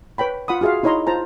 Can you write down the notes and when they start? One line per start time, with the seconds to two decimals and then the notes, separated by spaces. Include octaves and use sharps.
0.18 B4 C#5 G5 B5
0.48 F4 F#5 B5 D#6
0.61 F4 F#4 G#4 E5 F5
0.83 D#4 E4 C#5 D#5 A#5 C6
1.07 F4 C5 A5 A#5